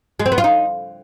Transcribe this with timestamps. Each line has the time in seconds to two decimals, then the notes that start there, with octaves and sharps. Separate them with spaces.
0.20 G#3
0.26 C4
0.32 B3
0.38 F4
0.44 D#4